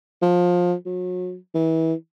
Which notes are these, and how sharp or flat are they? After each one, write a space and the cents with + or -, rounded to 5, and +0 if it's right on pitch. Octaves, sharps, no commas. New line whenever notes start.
F3 +20
F#3 -35
E3 -30